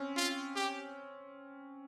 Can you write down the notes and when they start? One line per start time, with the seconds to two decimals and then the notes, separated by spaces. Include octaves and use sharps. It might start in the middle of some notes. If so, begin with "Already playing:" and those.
Already playing: C4 C#4
0.16 F4
0.56 G4